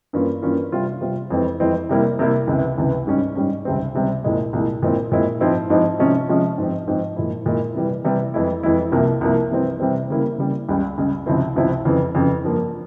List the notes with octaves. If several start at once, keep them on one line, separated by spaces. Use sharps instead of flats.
G2 E3 A#3 C#4 F4
G2 E3 A#3 C#4 F4
C3 G3 C4 F4
C3 G3 C4 F4
F2 E3 G#3 C4 E4
F2 E3 G#3 C4 E4
C3 G3 A#3 E4
C3 G3 A#3 E4
C#2 C3 E3
C#2 C3 E3
G#2 G3 C#4
G#2 G3 C#4
C#2 C3 G3 C4
C#2 C3 G3 C4
C2 A#2 G#3 E4
C2 A#2 G#3 E4
A#2 G#3 C4 E4
A#2 G#3 C4 E4
G#2 F3 G#3 C4 E4
G#2 F3 G#3 C4 E4
C3 F3 G#3 C#4
C3 F3 G#3 C#4
G#2 F3 C4
G#2 F3 C4
A#2 G#3 E4
A#2 G#3 E4
C3 E3 G3
C3 E3 G3
F2 E3 G#3 E4
F2 E3 G#3 E4
C2 C3 F3 A#3
C2 C3 F3 A#3
C3 E3 G3 C4
C3 E3 G3 C4
C#3 G3 A#3 E4
C#3 G3 A#3 E4
C#2 C#3 G3
C#2 C#3 G3
C#2 C3 F3 C4 E4
C#2 C3 F3 C4 E4
F2 C#3 E3
F2 C#3 E3
G2 F3 A#3